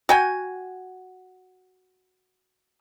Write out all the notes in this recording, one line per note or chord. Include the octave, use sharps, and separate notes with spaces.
F#4 G5 G#5